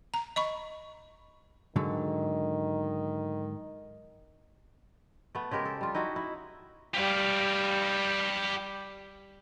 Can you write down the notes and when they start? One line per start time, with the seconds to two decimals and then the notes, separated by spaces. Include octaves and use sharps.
0.14 A#5
0.36 D#5 B5 C#6
1.76 G#2 D3 D#3 F#3
5.35 A3 B3
5.51 C#3 G#3 G4 A#4
5.65 A4
5.81 G3 F4
5.95 D#4 E4 F#4
6.16 E4
6.94 G3 G4 F5